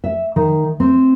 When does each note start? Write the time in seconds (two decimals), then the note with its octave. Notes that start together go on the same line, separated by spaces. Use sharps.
0.04 E5
0.36 D#3
0.80 C4